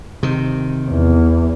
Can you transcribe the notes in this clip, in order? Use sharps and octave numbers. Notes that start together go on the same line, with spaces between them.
C3 D#3
E2